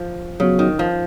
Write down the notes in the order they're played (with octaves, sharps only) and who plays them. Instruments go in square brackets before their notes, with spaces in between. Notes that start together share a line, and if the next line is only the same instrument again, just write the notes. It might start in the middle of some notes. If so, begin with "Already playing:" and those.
Already playing: [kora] F3
[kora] C#3 [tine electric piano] F#3 B3 F#4
[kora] D#3
F3